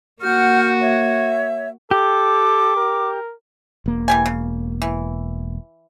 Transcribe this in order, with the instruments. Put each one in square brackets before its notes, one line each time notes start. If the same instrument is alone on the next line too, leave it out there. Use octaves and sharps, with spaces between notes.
[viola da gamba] A#3 F#4 [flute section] F#5 F6 G6
[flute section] C#5 E5
[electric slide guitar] G4 [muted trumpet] A4 [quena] D6
[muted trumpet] A#4
[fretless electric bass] E1 A#3
[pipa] E3 G4 G#5
C#3
E3